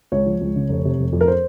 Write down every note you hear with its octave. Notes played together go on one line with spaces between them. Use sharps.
C#2 C#5
F3
C#2
C#3
F1
C3
F1
F2
A#4
C5